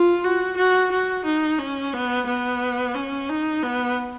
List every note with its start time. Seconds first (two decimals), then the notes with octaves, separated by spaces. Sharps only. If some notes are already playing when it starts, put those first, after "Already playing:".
Already playing: F4
0.24 F#4
0.57 F#4
0.91 F#4
1.25 D#4
1.59 C#4
1.94 B3
2.26 B3
2.95 C#4
3.29 D#4
3.63 B3